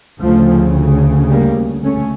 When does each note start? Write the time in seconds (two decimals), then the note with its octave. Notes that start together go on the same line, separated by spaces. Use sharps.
0.21 D2 C#3 F3 A3
1.30 G3 A#3
1.84 A3 C#4